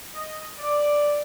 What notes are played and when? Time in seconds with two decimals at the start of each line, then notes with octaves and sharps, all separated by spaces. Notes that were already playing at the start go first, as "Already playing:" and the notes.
0.15 D#5
0.58 D5